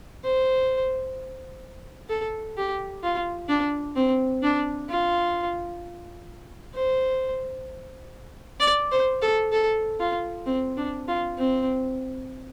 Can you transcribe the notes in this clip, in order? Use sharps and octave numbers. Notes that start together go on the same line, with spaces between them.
C5
A4
G4
F4
D4
C4
D4
F4
C5
D5
C5
A4
A4
F4
C4
D4
F4
C4